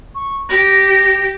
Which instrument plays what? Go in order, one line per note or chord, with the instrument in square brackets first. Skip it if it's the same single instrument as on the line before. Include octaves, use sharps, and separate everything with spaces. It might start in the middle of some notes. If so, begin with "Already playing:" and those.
[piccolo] C#6
[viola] G4 G5 [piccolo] A#6